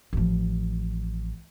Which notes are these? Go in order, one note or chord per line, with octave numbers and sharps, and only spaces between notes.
A1 F3